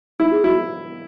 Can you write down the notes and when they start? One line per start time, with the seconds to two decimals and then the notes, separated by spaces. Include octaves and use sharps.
0.20 D#4 E4
0.31 G#4
0.44 E4 F#4